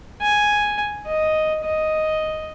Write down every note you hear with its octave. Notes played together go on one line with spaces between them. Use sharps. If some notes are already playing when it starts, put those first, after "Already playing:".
G#5
D#5
D#5